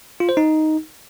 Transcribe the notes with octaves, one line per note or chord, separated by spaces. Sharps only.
F4
C5
D#4